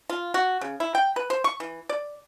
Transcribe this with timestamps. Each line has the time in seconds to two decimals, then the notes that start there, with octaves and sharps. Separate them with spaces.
0.10 F4
0.34 F#4
0.61 C#3
0.80 E4
0.95 G5
1.16 B4
1.30 C5
1.44 C#6
1.60 E3
1.89 D5